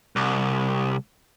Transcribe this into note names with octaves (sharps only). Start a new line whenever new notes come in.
C2